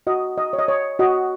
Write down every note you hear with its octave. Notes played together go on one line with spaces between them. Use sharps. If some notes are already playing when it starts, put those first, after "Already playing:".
F#4 D#5
D#5
C#5
D#5
C#5
F#4 D#5